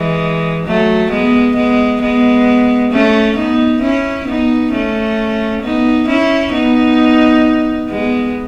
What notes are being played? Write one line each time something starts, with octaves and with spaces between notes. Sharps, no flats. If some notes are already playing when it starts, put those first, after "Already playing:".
Already playing: E3 G#3
F#3 A3
G#3 B3
G#3 B3
G#3 B3
A3 C#4
B3 D#4
C#4 E4
B3 D#4
A3 C#4
B3 D#4
C#4 E4
B3 D#4
G#3 B3